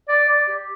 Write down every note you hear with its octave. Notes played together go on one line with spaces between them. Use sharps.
D5
D5
G4